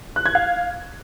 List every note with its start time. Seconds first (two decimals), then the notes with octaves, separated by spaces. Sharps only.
0.16 F#6
0.26 G#6
0.35 F5